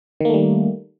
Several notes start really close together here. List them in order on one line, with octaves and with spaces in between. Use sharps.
D#3 A#3 A3 G3